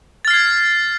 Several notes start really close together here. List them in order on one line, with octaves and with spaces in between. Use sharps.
A6 F6 C7 G#6